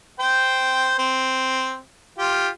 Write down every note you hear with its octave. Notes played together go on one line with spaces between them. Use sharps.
C5 G5
C4
F4 G4